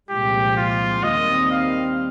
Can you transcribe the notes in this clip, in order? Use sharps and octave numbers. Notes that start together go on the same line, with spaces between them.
C2 A#2 F3 G#3 G4
F4
D#2 D#3 G3 C4 D#5
F5